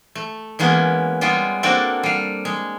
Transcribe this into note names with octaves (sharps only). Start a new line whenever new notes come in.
A3
E3 G#3 A#3 B3 C#4
G3 G#3 B3 F4
A#3 C4 D4 F#4 A4 D5
G3 F5
G#3